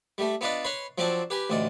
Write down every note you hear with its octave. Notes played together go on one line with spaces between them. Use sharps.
G3 A3
B3 D4 F4 B4 D5 D#5
B4 C#5 B5 C6
F3 F#3 C4 D4 D5
G4 B4 G#5
A1 D2 D#4 D5